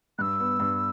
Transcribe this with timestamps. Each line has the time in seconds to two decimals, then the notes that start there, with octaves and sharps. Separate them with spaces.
0.18 G2 E6 F#6
0.40 B3
0.60 G2